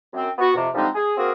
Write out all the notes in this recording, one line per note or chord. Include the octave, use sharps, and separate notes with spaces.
F#2 C4
B3 F#4
F2 C3
D3 F3 G3 G#3 C4 D#4
G#4
A#3 C4 F#4 G#4 A#4